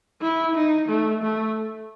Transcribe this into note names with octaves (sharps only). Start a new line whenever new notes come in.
E4
D#4
A3
A3